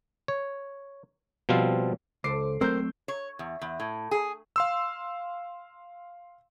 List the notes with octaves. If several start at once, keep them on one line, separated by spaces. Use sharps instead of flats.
C#5
B2 F3 G3 C4 F5
C#2 A4 C5 D6 C7 D7
D#2 F#3 A3 C4 A#4 C5 E6 G6
C#5
E2
E2
A2
G#4
F5 C6 E6